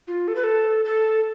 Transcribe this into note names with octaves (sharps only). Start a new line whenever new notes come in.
F4
A4
B4
A4
A4